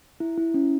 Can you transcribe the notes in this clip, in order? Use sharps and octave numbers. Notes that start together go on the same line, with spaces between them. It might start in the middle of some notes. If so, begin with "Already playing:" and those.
E4
E4
C#4